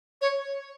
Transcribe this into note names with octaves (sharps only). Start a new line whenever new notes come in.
C#5